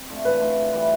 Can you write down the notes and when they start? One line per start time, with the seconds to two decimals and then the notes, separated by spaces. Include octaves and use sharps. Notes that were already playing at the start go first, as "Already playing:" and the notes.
Already playing: C4
0.09 A3 D4 F4
0.25 E3 B4
0.41 A3 D4 F4
0.57 C#3
0.73 E3 G3